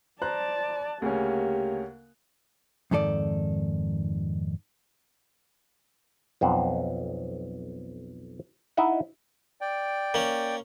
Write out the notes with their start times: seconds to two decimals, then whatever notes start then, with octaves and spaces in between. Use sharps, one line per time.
0.22 C5 D5 A5 A#5 F#6
1.02 D2 C#3 A#3 C#4 G4
2.91 F2 G#2 D#3 A4 D5
6.41 B1 F2 C5 F#5
8.77 D#4 E4 D#5 E5 F#5
9.61 D5 G5
10.14 A#3 C#4